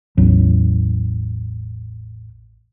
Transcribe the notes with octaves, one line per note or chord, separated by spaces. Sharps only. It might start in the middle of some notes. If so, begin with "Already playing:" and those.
A1 E2 F#3